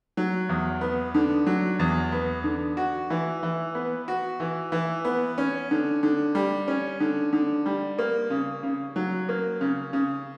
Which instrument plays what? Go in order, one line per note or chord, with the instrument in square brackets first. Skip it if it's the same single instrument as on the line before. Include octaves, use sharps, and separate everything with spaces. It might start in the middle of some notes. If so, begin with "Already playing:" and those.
[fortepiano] F#3
E2
B3
D3
F#3
E2
B3
D3
F#4
E3
E3
B3
F#4
E3
E3
B3
C#4
D3
D3
G3
C#4
D3
D3
G3
A#3
C#3
C#3
F#3
A#3
C#3
C#3